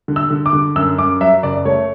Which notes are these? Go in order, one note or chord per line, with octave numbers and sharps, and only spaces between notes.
D3
E6
D3
D6
D3
F#2 E6
F#2 D6
F#3 E5
F#1 D5
A3 C#5